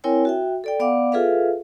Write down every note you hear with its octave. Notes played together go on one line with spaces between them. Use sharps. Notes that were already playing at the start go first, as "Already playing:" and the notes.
C4 E4 A#4 C#5 G5 G#5
F#4 E5 G5
A4 D5 G5
B3 D5 F5 F#5 D6
F4 G#4 A4 B4 E5 F5